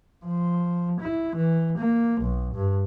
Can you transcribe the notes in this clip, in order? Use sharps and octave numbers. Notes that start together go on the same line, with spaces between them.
F3
E4
E3
A#3
B1
G2